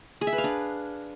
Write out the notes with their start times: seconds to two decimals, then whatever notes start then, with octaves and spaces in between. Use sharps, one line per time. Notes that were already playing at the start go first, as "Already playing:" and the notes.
0.21 G#4
0.27 E5
0.33 B4
0.38 F5
0.44 D4